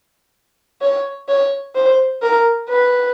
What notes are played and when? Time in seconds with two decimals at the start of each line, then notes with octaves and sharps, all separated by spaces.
0.82 C#5
1.28 C#5
1.75 C5
2.22 A#4
2.69 B4